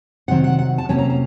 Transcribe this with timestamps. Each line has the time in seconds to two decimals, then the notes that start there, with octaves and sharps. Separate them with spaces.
0.28 C3 D#3 F#3 C4 F#5
0.44 F#5
0.59 F#5
0.78 A5
0.89 C3 F#3 A#3 C#4 A5
0.99 A#5
1.10 A#5